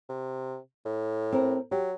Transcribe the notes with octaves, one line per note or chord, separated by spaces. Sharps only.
C3
A2
C4 A#4
F#3 G4